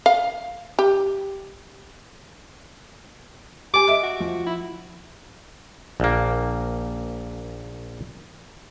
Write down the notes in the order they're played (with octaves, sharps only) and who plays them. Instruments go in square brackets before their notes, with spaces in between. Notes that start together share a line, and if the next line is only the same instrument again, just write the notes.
[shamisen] F5
G4
[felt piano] G4 G#5 [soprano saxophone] D6
[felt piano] D#5 E5 D7
[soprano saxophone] F#4
[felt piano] F3
[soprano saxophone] E4
[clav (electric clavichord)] A#1 A#3